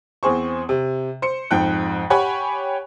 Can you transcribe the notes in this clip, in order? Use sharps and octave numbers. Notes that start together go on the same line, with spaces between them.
E2 C4 G#4 C5 C#6
C3
C5 C#7
F2 G#2 G5 F#6
G4 C#5 F#5 G#5 B5 C#6